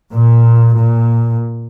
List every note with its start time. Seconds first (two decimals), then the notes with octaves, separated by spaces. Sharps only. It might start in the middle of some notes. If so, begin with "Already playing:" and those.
0.12 A#2
0.77 A#2